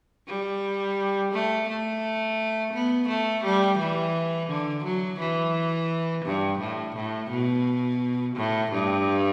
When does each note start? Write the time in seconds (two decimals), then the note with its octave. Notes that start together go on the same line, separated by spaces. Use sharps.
0.27 G3
1.33 A3
1.69 A3
2.73 B3
3.08 A3
3.44 G3
3.79 E3
4.49 D3
4.84 F#3
5.20 E3
6.25 G2
6.60 A2
6.96 A2
7.30 B2
8.36 A2
8.72 G2